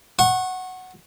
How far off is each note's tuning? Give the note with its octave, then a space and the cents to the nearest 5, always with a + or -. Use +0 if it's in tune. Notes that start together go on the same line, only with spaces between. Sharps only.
F#5 +0 C#6 -30